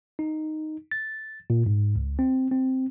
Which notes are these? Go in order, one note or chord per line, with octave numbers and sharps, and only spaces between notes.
D#4
A6
A#2
G#2
C#2
C4
C4